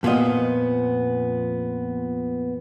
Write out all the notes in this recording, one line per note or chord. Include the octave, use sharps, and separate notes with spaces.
F2 A#2 F3 B3 D#5